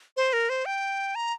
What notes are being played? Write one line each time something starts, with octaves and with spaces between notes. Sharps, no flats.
C5
A#4
C5
G5
A#5